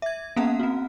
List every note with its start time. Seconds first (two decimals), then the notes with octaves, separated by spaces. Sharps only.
0.02 E5 G#6
0.36 A#3 B3 C#4 F5 F#5 A#5
0.60 C4 F#4